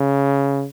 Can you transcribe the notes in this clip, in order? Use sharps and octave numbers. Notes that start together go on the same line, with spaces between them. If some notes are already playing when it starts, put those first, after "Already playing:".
Already playing: C#3